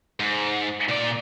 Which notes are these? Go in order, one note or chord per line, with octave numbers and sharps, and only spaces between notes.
G#2
A#2 D5